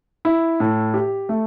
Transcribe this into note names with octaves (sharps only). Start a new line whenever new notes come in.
E4
A2
G4
A3